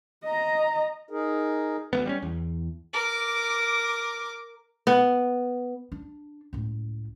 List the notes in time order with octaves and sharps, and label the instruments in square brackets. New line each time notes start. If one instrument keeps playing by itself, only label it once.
[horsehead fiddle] D#5 A#5
[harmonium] D#4 G#4 A#4
[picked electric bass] D2 A#3 B3
G3 C4 C#4
E2
[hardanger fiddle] A#4 D6
[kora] B3
[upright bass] D4
C#2 A2